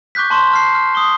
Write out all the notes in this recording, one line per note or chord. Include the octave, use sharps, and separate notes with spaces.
C#6 D6 F#6 G6 B6
A5 C6 C#6 F#6 E7
A5 F6 C7
F6
D#6 G7